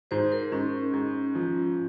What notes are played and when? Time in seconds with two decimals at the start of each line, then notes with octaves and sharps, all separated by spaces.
0.11 G#2 C5
0.32 A#4
0.52 G#2 C#4
0.93 G#2
1.35 F3